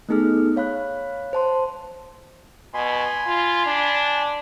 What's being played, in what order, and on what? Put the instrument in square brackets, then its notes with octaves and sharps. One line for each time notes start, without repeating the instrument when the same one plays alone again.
[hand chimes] A3 B3 D#4 G#4 A4 F6
C#5 F5 B5 F#6
C5 A5 C6
[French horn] B2 [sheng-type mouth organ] G#5 B5 C6
[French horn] F4
D4